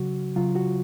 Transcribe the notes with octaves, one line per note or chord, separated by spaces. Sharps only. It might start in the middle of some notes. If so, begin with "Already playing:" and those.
Already playing: C#3 F#3 F#4
C#3 F#3 F4
F#4